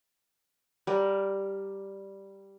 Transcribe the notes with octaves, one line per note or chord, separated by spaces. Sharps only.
G3 A#4